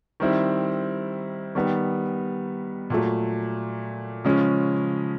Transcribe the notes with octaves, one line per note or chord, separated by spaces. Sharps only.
D#3 G3 C4 E4
D#3 G3 B3
A#2 F#3 A3
C#3 F3 G#3 C#4